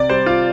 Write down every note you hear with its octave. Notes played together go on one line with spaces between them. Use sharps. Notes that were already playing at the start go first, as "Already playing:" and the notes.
Already playing: C3 D5
G3 C5
F4